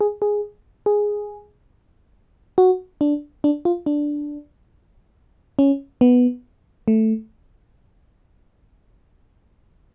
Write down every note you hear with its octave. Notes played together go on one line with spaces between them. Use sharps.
G#4
G#4
G#4
F#4
D4
D4
F4
D4
C#4
B3
A3